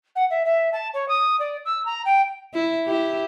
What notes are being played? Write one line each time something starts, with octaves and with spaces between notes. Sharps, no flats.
F#5
E5
E5
A5
C#5
D#6
D5
E6
A#5
G5
E4
E4 G4